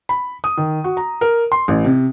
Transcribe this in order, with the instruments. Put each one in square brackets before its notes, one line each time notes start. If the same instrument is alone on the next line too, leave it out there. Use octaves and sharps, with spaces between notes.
[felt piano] B5
D#6
D#3
F#4
A#5
A#4
C6
A1
C3